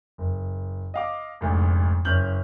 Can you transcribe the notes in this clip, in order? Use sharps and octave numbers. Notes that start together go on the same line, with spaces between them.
F#1
D#5 F5 D6
F1 D2 G#2
F#1 C#4 F6 G6 F#7